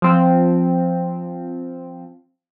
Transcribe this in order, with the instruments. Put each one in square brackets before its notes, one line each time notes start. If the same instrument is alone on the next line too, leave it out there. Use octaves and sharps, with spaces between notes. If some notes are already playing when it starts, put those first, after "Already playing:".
[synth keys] F3 C4